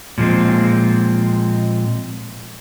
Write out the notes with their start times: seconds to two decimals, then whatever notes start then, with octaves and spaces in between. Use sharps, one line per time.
0.18 A#2 F3 G#3 C4